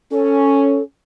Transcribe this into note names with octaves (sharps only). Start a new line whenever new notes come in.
C#4 A4